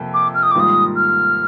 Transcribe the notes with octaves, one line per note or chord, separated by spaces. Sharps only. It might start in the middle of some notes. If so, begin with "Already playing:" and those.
Already playing: F2 C3 A#3
D6
F6
D#6
D6
G#2 D#3 G3 A#3 F4 D#6
F6